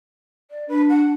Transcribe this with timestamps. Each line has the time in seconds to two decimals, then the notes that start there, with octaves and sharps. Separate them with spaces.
0.50 D5
0.68 D4 B4
0.89 F#5